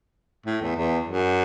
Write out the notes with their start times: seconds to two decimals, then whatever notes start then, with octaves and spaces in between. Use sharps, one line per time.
0.46 A2
0.61 E2
0.76 E2
1.07 F#2